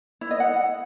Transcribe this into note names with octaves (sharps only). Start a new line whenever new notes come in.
E4
D#5
F#5